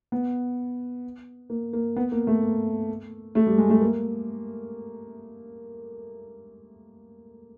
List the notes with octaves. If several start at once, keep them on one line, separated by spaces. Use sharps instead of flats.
B3
A#3
A#3
B3
A#3
A3
A#3
A3
G3
G#3
A3
A#3